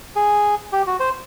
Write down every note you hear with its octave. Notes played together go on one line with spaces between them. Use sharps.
G#4
G4
F#4
C5